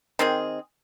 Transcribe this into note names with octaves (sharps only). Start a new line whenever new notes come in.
D#3 C4 G#4